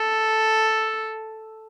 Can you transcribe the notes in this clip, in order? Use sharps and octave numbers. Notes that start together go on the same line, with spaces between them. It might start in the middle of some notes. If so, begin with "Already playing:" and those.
Already playing: A4